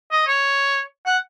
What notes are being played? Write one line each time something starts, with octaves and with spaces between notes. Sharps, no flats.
D#5
C#5
F#5